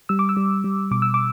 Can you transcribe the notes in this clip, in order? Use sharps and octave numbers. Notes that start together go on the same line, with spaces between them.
G3 E6
D6
E6
G3
G3
B2 D6
E6
D6